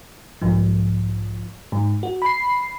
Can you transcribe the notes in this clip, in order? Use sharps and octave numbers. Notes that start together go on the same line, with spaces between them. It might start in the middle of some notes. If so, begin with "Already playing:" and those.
B1 G#2 F3
G#2
F#4
B5 C7